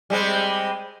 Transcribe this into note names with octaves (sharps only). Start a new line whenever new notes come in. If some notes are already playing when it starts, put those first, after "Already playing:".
G3 G#3 C4